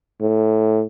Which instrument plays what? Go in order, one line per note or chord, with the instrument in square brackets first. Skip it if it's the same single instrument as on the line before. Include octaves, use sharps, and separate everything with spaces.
[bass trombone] A2